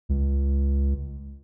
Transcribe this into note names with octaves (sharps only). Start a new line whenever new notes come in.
C#2